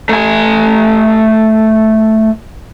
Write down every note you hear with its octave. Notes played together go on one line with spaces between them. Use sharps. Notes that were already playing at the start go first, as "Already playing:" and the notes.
A3 G#5